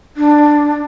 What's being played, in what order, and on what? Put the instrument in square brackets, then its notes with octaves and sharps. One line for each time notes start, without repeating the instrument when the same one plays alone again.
[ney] D4